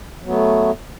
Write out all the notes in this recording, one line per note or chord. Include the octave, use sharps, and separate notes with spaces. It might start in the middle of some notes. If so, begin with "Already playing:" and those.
F#3 A3 B3